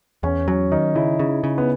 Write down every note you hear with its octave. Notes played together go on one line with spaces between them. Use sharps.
E2 C#4
F#3 C#4
D#3 D#4
C#3 E4
C#3
C#3
B3